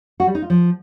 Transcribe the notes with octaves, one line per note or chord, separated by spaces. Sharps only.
F#4
G3
D#4
F4
F3